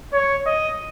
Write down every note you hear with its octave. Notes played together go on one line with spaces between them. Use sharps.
C#5
D#5